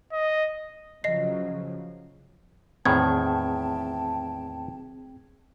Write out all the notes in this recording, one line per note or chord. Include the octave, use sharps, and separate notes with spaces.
D#5
C#3 F3 F#3 D#5 C7
E2 A2 D#3 C4 G#4 G5 A5 G#6